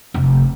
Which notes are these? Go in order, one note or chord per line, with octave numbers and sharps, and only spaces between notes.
F1